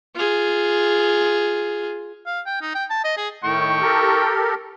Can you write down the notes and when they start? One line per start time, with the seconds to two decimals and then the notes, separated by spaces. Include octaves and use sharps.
0.16 F4 G#4
2.26 F5
2.46 G5
2.62 D#4
2.75 G5
2.90 A5
3.04 D#5
3.17 G#4
3.44 A2 D#3 A3 G5 C#6
3.82 G4 A4 A#4